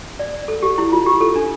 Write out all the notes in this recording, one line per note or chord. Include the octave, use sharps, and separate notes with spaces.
D5
A4
G4
E4
F4
G4
A4
D4